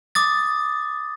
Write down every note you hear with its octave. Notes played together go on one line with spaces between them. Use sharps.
D6 D#6 A6